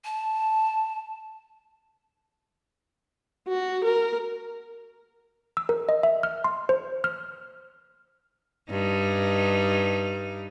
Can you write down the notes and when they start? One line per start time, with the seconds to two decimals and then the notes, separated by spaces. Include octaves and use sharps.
0.05 A5
3.48 F#4
3.84 A#4
5.57 E6
5.69 A#4
5.89 D#5
6.03 E5
6.23 F6
6.44 C6
6.69 C5
7.04 F6
8.70 G2 D#4